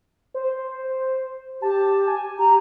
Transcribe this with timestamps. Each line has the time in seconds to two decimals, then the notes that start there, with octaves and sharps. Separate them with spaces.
0.34 C5
1.62 G4 A5
2.07 G#5
2.39 G4 A#5